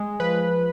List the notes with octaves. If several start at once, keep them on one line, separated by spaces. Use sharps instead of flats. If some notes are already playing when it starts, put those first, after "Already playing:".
Already playing: G#3
F3 B4